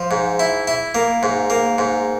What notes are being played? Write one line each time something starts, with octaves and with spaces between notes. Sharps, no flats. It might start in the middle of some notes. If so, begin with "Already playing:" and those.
Already playing: F3
G#2
E4
E4
A#3
G#2
A#3
G#2